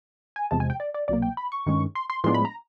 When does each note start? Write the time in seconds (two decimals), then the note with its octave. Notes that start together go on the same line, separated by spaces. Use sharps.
0.36 G#5
0.51 E2 C3 F3 G#3 A5
0.60 G#5
0.70 G5
0.80 D5
0.94 D5
1.08 C2 B2 F#3 A#3 D5
1.22 G5
1.37 B5
1.52 C#6
1.66 G2 D#3 G#3 C#4
1.95 C6
2.10 C6
2.24 A2 F3 G#3 B3 D4 C6
2.34 B5
2.45 A#5